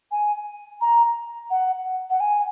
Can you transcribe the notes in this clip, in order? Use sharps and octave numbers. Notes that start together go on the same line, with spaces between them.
G#5
A#5
F#5
F#5
G#5